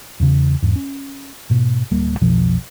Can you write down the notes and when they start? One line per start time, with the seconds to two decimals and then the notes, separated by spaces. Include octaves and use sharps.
0.20 E2 C#3
0.62 E2 G#2
0.76 C#4
1.50 G#2 B2
1.91 D1 G3 A#3
2.21 B1 F2 B2 F3